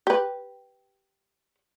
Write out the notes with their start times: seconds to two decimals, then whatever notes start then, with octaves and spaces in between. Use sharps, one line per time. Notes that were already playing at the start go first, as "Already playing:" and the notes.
0.07 G4 B4